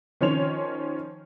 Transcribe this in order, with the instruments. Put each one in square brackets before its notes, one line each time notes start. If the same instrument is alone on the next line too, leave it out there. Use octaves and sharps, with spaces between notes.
[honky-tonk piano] D#3 F3 C#4 C#5 C6 F7